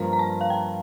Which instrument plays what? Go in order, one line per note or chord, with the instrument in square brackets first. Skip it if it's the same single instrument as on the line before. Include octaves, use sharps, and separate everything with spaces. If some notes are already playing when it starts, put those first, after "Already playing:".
Already playing: [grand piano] G2 F3 A#3 F4 A#4 [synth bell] A#5
[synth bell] A#5
A5
F5
G5